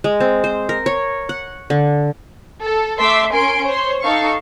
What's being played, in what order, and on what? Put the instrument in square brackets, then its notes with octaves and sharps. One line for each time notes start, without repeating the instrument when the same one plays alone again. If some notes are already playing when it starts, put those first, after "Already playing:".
[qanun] G#3
C4
C5
A#4
C#5
F#5
D3
[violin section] A4
A3 E5 C6 D6 B6
C#4 A#4 G#5 C6 D7
C5 C#5 C6
D#4 A4 F5 C#6